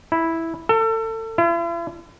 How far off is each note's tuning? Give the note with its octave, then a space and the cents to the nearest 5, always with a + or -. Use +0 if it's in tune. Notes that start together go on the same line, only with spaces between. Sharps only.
E4 -5
A4 +30
E4 +45